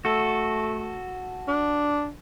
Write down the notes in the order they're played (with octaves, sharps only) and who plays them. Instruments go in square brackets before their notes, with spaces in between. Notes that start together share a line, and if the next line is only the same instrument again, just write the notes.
[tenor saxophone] A3 [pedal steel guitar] F#4 A4
[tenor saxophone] D4